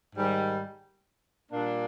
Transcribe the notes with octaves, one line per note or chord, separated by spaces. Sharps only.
G#2 D#3 G3
A#2 G3 A#3 D4